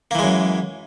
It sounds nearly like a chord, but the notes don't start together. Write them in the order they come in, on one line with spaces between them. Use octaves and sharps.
A#3 E3 G#3 F#2